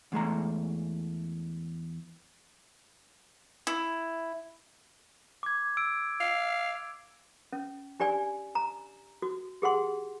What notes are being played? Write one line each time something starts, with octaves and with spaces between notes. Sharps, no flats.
E2 G#3 A3 A#5
E4
D6 G#6
E6 D7
F5
C#4
D4 G4 D5 G#5
A#5
F#4
G4 G#4 F#5 C6